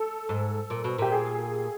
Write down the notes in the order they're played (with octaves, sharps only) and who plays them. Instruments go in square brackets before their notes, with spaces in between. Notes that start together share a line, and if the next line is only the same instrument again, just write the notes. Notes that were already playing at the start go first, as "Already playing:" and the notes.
Already playing: [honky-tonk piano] A4
[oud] G#2
A#2
B2
[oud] A#2 [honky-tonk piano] G4
[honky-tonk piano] G#4